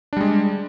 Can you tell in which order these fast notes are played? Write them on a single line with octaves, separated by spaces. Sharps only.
D4 G3 G#3